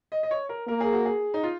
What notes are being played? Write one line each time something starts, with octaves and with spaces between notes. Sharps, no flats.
D#5
D#5
C#5
A#4
A#3 A#4
G#4
F#4
G#4
D#4
F4